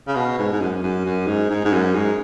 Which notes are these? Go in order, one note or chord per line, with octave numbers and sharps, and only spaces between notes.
C#3
B2
G#2
G#2
F#2
F#2
F#2
G#2
G#2
G#2
F#2
G#2